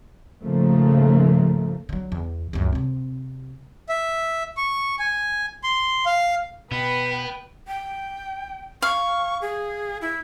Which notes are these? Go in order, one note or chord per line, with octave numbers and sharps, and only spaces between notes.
D#2 G#2 C#3 F3 A3 A#3
D3 F#3
E2
C#2 F#2
C3 C4
E5
C#6
G#5
C6
F5
B2 B3 B4 G5 B5
G5
F5 C#6
G#4
E4